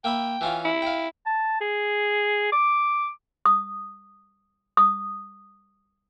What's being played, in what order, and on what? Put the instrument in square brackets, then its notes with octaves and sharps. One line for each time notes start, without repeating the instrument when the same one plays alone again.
[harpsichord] A#3 E5 B5 [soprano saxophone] G5
[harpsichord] E3 C#4 F4
[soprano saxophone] E4
[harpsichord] F5 G5
[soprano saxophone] A5
G#4
D6
[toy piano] D#6
D#6